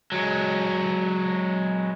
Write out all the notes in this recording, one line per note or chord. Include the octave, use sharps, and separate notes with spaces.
F#3 G#3